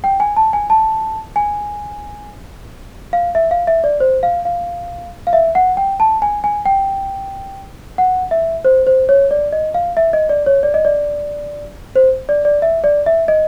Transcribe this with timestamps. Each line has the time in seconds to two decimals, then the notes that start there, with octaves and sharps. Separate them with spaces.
0.04 G5
0.20 G#5
0.36 A5
0.53 G#5
0.70 A5
1.36 G#5
3.13 F5
3.35 E5
3.51 F5
3.67 E5
3.84 D5
4.00 C5
4.23 F5
4.45 F5
5.27 F5
5.33 E5
5.55 F#5
5.77 G5
6.00 A5
6.22 G#5
6.44 G#5
6.66 G5
7.98 F#5
8.31 E5
8.65 C5
8.87 C5
9.09 C#5
9.31 D5
9.53 D#5
9.74 F5
9.97 E5
10.13 D#5
10.29 D5
10.46 C#5
10.63 D5
10.74 D#5
10.85 D5
11.96 C5
12.29 D5
12.45 D5
12.62 E5
12.84 D5
13.06 E5
13.28 D#5